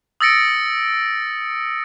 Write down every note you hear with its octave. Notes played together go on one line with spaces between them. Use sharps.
D#6 E6 A6 A#6 C#7 D7